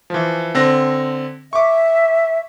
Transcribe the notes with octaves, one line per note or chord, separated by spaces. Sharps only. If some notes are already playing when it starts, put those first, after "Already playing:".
E3 F3
D3 C4 A#6
E5 C#6 D6